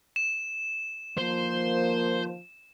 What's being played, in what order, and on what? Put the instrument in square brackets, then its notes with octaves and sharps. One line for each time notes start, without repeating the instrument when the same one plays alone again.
[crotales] E7
[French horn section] D3 D#3 F3 [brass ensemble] A#3 [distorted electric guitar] C5